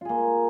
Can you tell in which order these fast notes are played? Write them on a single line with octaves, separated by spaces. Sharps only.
F4 G#4 A#3